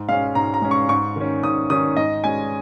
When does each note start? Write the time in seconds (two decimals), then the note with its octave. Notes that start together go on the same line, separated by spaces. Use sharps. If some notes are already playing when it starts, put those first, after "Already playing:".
Already playing: G#2
0.09 G#3 C#4 F5
0.35 G#2 A#5
0.54 A#5
0.62 G#3 C#4
0.71 C#6
0.89 G#2 C#6
1.16 D#3 C#4
1.43 G#2 D#6
1.70 D#3 C#4 D#6
1.96 G#2 D#5
2.24 G#3 C#4 G#5